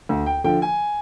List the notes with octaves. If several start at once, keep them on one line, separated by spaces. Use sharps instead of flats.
D2
G5
D3 F3 G5
G#5